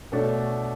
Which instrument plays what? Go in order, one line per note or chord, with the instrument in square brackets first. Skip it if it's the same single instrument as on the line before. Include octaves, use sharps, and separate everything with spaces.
[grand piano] B2 A3 D4 A4 C#5